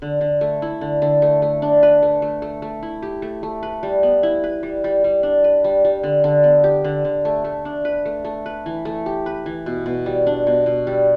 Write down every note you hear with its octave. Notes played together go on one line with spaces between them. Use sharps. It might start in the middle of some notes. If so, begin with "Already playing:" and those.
D3
D3
A3
E4
D3
D3
A3
A3
D4
B4
A3
A3
A3
A3
E4
G4
A3
A3
B4
G3
B3
E4
B4
G3
G3
G3
D4
B4
G3
G3
D3
D3
B3
G4
D3
D3
A3
A3
D4
B4
A3
A3
B4
E3
A3
G4
B4
E3
B2
B2
G3
D4
B2
B2
G3